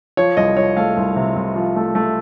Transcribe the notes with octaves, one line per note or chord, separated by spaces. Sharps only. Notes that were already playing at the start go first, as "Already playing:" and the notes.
F3 C#5
C2 D#5
F3 C#5
A3 F5
C2
C3
C2
F3
A3
A3